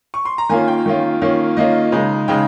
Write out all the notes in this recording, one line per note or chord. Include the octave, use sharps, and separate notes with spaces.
C#6
C6
A#5
D#3 A#3 C#4 F4 G#5
G5
D#3 A#3 C#4 F4
D#3 A#3 C#4 F4
D#3 A#3 C#4 F4 D#5
C#3 G#3 D#4
C#3 G#3 D#4 G5